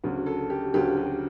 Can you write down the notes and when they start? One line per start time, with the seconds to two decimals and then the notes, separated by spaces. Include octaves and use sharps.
0.04 D2 C#3 F#3
0.26 A4
0.50 G4
0.74 D2 C#3 F#3 G4
0.97 G4